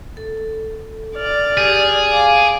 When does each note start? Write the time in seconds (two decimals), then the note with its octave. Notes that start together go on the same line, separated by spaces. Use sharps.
0.17 A4
1.16 D5 F6
1.57 G4 G#4
2.12 F5 G#5 D6